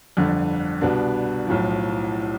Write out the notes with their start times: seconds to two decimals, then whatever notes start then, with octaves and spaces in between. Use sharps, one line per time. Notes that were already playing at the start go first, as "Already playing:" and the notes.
0.17 G1 F2 D3
0.81 C2 B2 B3 D4
1.47 B1 A2 F3